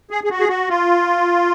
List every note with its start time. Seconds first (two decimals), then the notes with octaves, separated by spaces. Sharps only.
0.11 G#4
0.24 G#4
0.30 F#4
0.40 G#4
0.48 F#4
0.69 F4